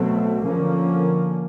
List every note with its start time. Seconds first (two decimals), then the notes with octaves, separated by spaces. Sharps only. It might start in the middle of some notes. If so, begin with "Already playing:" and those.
Already playing: B2 F#3 A3 C4
0.44 D3 F3 A#3 C#4